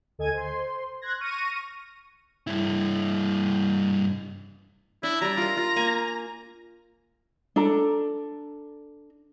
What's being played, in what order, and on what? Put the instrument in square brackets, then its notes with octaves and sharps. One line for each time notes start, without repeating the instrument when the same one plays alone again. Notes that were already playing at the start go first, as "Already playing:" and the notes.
[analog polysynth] D2 A4 D#5 G#5 G#6 D#7
C5 C6
C6 F#6 G#6 A#6
C#6 F6 A#6 D#7
[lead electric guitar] G2 E4
[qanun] D4 [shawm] E4
[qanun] G3 D5 [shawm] A#5
[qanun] F4 A#4
F4
A#3 G#5
[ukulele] D4 A4 A#5